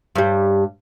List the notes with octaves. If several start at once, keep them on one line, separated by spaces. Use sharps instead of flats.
G2 G3